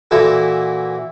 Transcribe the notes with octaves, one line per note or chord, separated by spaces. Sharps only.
A#2 E3 E4 F#4 A4